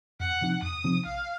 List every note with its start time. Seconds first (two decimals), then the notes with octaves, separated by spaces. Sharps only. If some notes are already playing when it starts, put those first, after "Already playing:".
0.20 F2 F#5
0.41 C3 F3 C4 D#4
0.63 F2 D#6
0.84 C3 F3 C4 D#4
1.05 A#1 F5